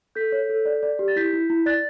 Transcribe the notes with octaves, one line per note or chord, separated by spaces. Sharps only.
A4 G6 B6
C#5
A4
D5
D5
G4
A6
E4 G6 B6
E4
E4
D5 F#6 A6